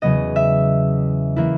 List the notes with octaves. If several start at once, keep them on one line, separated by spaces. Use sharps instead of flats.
E2 C#3 F#3 B3 D#5
E5
E3 A#3 E4